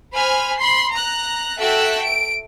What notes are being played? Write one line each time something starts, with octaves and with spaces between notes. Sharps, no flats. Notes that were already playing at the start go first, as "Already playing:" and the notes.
C5 G#5 B5 F6
B5 C6 C7
A#5 F#6
F#4 A4 E5 G5 E6 F#6
D7